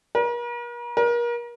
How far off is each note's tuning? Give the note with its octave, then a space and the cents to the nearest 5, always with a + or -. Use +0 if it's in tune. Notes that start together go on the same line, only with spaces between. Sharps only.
A#4 +45
A#4 +35